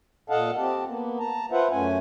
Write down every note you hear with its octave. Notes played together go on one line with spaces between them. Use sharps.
A#2 A4 D#5 F5 F#5 A5
C4 G4 A5
A#3 B3
A5 A#5
F4 B4 C5 E5 F#5
F#2 A3 C#4 G#5